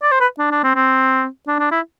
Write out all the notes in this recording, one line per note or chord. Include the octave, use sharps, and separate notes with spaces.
D5
C5
B4
D4
D4
C4
C4
D4
D4
E4